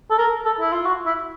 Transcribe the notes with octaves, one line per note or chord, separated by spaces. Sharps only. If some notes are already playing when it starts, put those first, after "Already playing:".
A4
A#4
A4
E4
F4
F#4
E4